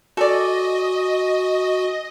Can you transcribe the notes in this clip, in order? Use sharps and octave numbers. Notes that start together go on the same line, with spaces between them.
F#4 A4 D5 D#5 G#5